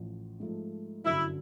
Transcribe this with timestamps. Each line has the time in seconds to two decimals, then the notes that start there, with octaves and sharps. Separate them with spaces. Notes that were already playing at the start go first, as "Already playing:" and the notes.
Already playing: A1 A2 F3
0.40 G#2 F3 A3
1.05 G1 F#2 D3 F#3 E4